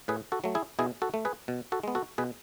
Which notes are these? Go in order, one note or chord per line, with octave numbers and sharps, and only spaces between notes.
A2 G#4 B4
F#4 A4
F#3 A3
E4 G#4
B2 E4 G#4
F#4 A4
A3
G#4 B4
B2
F#4 A4
G#3 B3
F#4 A4
B2 G#4 B4